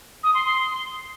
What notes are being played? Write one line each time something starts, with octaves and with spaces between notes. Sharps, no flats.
D#6
C6
C6